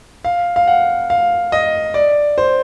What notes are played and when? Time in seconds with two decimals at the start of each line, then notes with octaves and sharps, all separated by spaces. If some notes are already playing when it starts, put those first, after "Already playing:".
0.25 F5
0.56 F5
0.67 F#5
1.10 F5
1.52 D#5
1.94 D5
2.38 C5